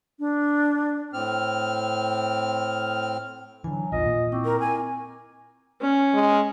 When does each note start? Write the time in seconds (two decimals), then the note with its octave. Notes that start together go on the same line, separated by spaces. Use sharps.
0.19 D4
1.13 A2 C4 F6
3.64 D3 E3 F#3 G#5
3.92 A#1 E2 D#3 F4 D#5
4.06 A#2
4.32 C4 E4 C#6 D6
4.45 A#4
4.60 G#5
5.81 C#4
6.14 G#3